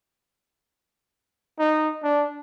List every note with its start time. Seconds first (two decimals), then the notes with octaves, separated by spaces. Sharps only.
1.59 D#4
2.03 D4